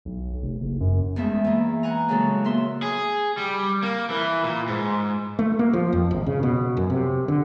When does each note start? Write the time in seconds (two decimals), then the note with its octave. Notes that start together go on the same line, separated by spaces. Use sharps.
0.05 B1
0.42 F1
0.60 F#1
0.80 F#2
1.16 E2 G#3 A3 E5
1.45 E3 A#3
1.83 F#5 G#5 A#5
2.09 A#2 C#3 F#3 G#3 F#4 A4
2.44 E2 A#3 E5 C6 E6
2.83 G#4
3.37 G3
3.83 A#3
4.10 E3
4.44 A#2
4.68 G#2
5.39 A3
5.59 A#3
5.73 F3
5.93 F2
6.11 G#1
6.26 C#3
6.43 B2
6.77 F#2
6.90 C3
7.28 D3